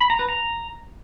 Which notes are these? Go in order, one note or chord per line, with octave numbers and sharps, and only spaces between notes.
B5
A#5
B4
A#5